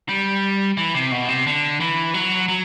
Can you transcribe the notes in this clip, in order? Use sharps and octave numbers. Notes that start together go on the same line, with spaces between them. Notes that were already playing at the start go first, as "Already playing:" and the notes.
G3
E3
C3
B2
C3
D3
E3
F#3
F#3